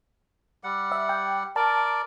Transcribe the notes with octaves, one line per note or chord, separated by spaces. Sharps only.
G3 F#5
E5
G5
A#4 D5 A5